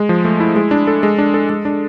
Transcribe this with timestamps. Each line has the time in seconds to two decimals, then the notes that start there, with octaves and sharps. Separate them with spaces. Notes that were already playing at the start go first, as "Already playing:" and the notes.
Already playing: G#3
0.09 F3
0.25 A3
0.40 E4
0.56 G#3
0.71 D4
0.87 A4
1.03 G#3
1.19 D4
1.34 A4
1.50 G#3
1.65 D4